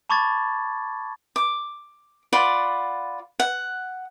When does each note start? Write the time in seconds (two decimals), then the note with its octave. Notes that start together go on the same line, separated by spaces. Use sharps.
0.09 A5 B5 C#6 D6 G#6 A6
1.36 D6
2.33 F4 D5 F#5 B5
3.40 F#5